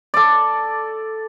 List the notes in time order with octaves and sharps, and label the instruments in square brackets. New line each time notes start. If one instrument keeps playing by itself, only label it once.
[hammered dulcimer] A4 D5